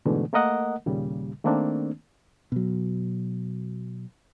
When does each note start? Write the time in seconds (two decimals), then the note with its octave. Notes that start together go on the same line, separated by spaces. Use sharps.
0.05 G#2 B2 D3 E3 A3
0.33 A3 A#3 A#4 D#5 F#5
0.86 D#2 A#2 C#3 G3
1.44 D#3 A3 A#3 C4 D4
2.52 B2 F#3